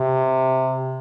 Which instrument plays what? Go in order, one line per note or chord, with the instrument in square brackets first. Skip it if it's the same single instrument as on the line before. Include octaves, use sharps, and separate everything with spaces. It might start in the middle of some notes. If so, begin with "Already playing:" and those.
Already playing: [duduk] C3